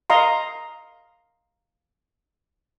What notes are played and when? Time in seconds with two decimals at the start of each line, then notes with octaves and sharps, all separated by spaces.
0.10 D#5 F5 A#5 C6